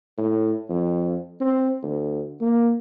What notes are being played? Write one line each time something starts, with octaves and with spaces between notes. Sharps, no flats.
A2
F2
C4
D2
A#3